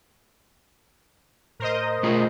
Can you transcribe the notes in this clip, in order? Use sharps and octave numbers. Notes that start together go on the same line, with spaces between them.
A2 A#4 C5 D#5
B2 A3 F4 G#4